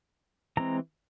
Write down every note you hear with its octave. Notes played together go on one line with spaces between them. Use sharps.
E3 G#3 C4 A#5